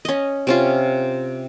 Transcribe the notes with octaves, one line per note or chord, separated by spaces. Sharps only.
C#4 D#5
C3 C#4 F4